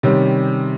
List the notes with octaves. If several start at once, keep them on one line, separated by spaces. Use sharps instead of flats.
C3 D#3 G3 C#4